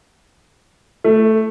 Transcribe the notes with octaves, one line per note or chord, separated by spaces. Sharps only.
A3